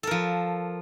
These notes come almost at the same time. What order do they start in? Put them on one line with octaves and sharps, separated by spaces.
A4 A#4 F3